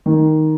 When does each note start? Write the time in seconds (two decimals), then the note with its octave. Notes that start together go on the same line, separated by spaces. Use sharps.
0.06 D#3